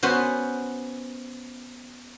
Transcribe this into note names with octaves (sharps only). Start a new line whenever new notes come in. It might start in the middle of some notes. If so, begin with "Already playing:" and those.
B3 C#4 F#4 C5